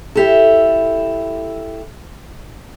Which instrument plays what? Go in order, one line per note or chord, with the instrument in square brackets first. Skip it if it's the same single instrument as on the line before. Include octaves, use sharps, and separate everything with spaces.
[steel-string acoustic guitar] E4 G4 A4